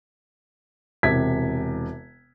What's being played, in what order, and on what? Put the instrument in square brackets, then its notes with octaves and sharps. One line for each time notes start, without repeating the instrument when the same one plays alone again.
[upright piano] E1 C3 G#6 B6